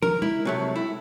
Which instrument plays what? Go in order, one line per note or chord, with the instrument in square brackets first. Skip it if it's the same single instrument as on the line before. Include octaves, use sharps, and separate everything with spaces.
[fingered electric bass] F3 D4 [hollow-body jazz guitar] A#4
[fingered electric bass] G#3 [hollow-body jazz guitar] E4
[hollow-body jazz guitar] C3 F#3 A3
E4